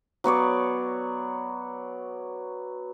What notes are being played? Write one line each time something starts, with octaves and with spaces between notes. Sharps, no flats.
F#3 B3 C#5 D5